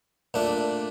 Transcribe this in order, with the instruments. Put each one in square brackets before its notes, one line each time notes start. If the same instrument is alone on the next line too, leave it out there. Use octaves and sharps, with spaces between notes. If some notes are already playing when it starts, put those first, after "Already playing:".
[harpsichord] A#2 A3 D4